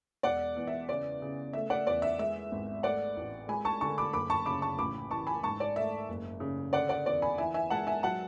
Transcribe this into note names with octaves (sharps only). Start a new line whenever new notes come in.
E1 D5 F#5
E2
E5
C#3 D5
C#3
A3 E5
D5 F#5
E2 D5
E5
G#3 E5
G#1
A3 D5 F#5
A1
G#3 G#5 B5
A5 C#6
D3 A5 C#6
B5 D6
F#1 B5 D6
A5 C#6
C#3 B5 D6
A5 C#6
A1 B5 D6
E3 A5 C#6
G#5 B5
G#2 A5 C#6
D5
A3 E5
F#1
C#3
D3 D5 F#5
D5 F#5
E2 D5
G#5 B5
E3 E5 G#5
E5 G#5
G#3 F#5 A5
E5 G#5
F#3 F#5 A5